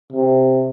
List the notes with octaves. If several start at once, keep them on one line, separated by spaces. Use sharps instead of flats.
C3